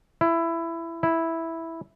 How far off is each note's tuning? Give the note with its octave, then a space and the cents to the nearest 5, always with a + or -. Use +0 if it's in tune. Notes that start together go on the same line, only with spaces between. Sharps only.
E4 +15
E4 -5